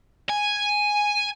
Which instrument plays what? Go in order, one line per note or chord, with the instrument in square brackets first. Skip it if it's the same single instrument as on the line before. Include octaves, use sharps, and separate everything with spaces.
[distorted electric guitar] G#5